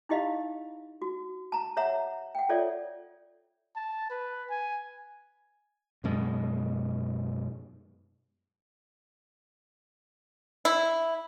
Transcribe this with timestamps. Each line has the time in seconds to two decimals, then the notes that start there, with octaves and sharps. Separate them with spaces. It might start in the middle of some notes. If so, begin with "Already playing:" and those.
0.09 D#4 E4 G4 D#5 F5 B5
1.02 F#4
1.52 A5 A#5
1.77 C#5 E5 F#5 A#5
2.35 F#5 G5
2.49 F4 A4 C#5 D5 E5
3.76 A5
4.10 B4
4.50 G#5
6.04 F#2 B2 G#3
10.65 E4